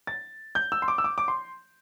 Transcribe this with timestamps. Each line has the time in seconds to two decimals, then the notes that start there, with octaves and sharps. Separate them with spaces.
0.07 A6
0.55 G6
0.72 E6
0.82 C6
0.88 D6
0.98 E6
1.04 D6
1.18 D6
1.28 C6